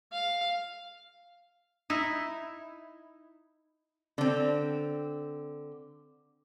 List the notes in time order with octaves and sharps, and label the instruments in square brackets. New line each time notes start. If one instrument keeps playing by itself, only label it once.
[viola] F5
[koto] D#4 E4
[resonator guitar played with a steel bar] D3 C4